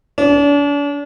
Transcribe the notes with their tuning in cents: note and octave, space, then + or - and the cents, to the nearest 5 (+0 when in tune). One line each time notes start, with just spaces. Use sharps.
D4 -40